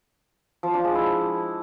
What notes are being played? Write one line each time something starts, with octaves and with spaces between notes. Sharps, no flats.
F3
D4
G#3
E4